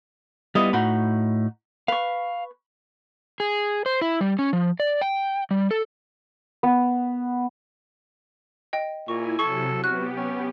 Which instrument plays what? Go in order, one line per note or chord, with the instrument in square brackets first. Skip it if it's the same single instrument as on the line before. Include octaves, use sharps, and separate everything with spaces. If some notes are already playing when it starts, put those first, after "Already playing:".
[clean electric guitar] G3 B3 [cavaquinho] E4 F4 D#5
[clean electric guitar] A2 [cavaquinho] D#4 F#4 B5
[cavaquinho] B4 C#6 [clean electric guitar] F5
[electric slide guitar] G#4
C5
E4
G3
C#4
F3
D5
G5
G3
A4
[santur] B3
[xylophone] D#5 G5
[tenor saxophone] A#2 [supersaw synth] E4 G#5 [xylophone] C#6
[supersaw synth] C3 F#3 [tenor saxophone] A4 [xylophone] C#6
[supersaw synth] B3 G4 [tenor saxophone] F#4 [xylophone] F6 F#6
[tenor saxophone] C#4